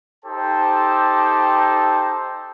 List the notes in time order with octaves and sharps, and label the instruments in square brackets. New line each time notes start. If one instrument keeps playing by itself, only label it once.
[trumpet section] D#4 G4 A4 C5 G5 A5